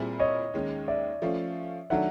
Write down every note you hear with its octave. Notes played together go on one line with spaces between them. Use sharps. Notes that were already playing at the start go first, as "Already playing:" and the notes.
Already playing: A#2 G3 C4 E4 G#4
C#5 D#5
D#2 D#3 G#3 C#4
D5 E5
F3 A3 C#4 F4
D#3 F#3 A3 D4 E5 F#5